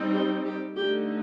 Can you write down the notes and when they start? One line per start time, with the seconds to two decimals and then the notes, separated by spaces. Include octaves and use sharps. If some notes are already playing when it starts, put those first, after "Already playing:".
Already playing: G3 C4 D#4
0.13 G4
0.45 G4
0.76 D3 A3 D#4 G4